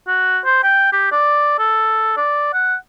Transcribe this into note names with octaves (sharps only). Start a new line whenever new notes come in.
F#4
C5
G5
G4
D5
A4
D5
F#5